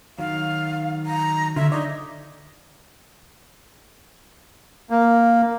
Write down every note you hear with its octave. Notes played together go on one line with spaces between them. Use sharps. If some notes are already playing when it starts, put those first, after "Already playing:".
D#3 F#3 F5
A#5
D3 F4 C#5 E5
D#4 D5
A#3